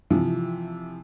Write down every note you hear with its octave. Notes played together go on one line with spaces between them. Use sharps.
C3 E3 F3